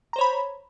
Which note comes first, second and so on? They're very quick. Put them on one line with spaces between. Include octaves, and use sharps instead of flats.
A#5 C5 C#5 B5